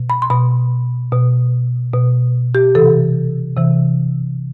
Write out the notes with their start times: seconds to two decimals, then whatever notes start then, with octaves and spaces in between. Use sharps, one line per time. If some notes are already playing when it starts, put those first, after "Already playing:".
Already playing: B2
0.10 B5
0.22 C6
0.30 B2 B5
1.12 B2
1.93 B2
2.55 G4
2.75 C3 E3 A4
3.57 C3 E3